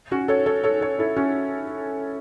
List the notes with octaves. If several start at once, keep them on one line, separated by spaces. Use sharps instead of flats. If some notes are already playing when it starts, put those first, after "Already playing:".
C#4 F#4
A4 C#5
A4 C#5
A4 C#5
A4 C#5
E4 A4
C#4 F#4